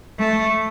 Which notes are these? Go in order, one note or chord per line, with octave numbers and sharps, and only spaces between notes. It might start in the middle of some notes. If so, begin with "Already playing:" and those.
A3